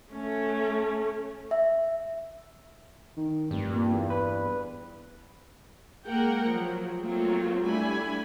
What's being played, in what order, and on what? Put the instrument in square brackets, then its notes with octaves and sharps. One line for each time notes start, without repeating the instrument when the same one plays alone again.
[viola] A3 C#4
[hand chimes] E5
[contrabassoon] D#3
[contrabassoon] F1 [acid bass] G2
[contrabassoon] A#2
E2
[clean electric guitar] B4
[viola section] G#3 A#3 A#4 F#5 G5
F3 F#3
F#3 A3 A#3 C4 F4
G3 A3 D4 E4 G#5 B5